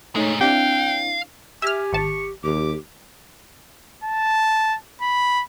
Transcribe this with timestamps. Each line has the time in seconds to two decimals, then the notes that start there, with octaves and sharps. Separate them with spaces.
0.15 A#2 G#3 A3 D#4 C#5
0.41 C4 D4 E4 F5 G5
1.62 G4 E5 G#5 F6
1.93 G#1 A5 C#6
2.44 D#2 G4 D6
4.04 A5
5.01 B5